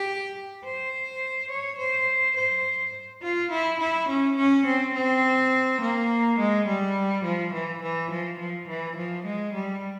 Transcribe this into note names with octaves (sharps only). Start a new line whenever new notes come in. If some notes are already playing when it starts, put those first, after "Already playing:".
Already playing: G4
C5
C#5
C5
C5
F4
E4
E4
C#4
C#4
C4
C4
A#3
G#3
G3
F3
E3
E3
F3
F3
E3
F3
G#3
G3